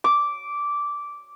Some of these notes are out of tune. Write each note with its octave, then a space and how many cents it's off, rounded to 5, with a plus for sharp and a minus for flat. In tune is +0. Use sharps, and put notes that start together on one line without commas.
D6 -10